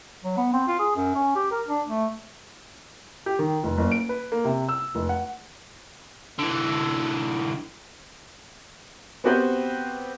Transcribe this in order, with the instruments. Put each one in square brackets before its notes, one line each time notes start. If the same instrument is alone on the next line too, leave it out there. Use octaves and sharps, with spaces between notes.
[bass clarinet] F#3
B3
C4
F4
G#4
F#2
C#4
G4
A#4
D4
A3
[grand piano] G4
D#3
F1
F#1
D7
B4
A#3
C3
E6
F1
F#5
[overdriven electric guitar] D3 E3
[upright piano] B3 C4 F#4 G4 B4 C5